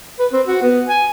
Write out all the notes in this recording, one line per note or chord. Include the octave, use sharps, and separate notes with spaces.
B4
C4
F#4
B3
G#5